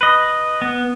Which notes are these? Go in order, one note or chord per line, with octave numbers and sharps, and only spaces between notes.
B4 D#5
B3